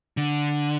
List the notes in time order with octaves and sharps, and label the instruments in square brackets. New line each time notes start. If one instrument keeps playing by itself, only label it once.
[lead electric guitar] D3